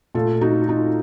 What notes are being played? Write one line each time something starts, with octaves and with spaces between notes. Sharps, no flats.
A#2 A3 F4 A4
D#4 F#4
D#4 F#4